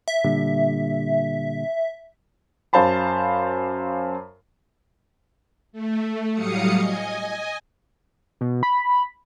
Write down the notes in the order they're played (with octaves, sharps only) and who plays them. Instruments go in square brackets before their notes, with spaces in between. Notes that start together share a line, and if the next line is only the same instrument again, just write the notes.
[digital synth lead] E5
[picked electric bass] A#2 D3 G3
[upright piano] F#2 C5 F5 A5 B5
[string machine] A3
A2 F#3 G3 F5 D#6 C#7
D#5 G#5
[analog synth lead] B2
B5